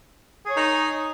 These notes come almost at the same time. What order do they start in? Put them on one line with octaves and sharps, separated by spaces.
G#4 C#5 D#4